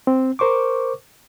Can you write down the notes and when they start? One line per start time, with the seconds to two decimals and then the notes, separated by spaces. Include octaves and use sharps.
0.07 C4
0.39 A#4 C5 C#6 D6